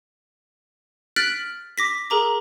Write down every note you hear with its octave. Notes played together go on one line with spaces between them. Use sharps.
F6 F#6 A6 B6 D7 F#7
D6 A#6 B6
G#4 A#4 A#5 D6